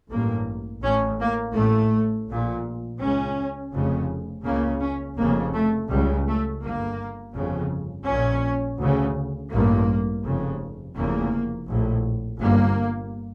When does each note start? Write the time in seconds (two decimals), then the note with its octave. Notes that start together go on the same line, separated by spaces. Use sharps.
0.10 A1 G2 A#3
0.82 A1 A2 C#4
1.20 A#3
1.55 A1 A2 A3
2.28 A#1 A#2
2.99 C#2 C#3 C#4
3.72 F1 F2 C#3
4.44 C#2 C#3 A#3
4.80 C#4
5.17 F1 F2 C#3 A#3
5.53 A3
5.89 C#2 C#3 G3
6.26 A3
6.62 G1 G2 A#3
7.34 G1 F2 C#3
8.06 A#1 A#2 C#4
8.79 D2 C#3
9.51 A1 G2 A#3
10.23 F1 F2 C#3
10.96 F1 E2 C#3 A#3
11.67 A#1 A2
12.40 G1 G2 A#3